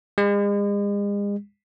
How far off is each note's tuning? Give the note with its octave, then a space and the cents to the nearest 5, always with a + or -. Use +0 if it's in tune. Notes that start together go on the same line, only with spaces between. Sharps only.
G#3 -40